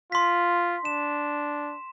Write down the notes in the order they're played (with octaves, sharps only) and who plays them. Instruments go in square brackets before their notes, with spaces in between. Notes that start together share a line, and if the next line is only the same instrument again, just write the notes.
[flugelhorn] F4 [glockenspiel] C6 B6
[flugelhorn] D4 [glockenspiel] E7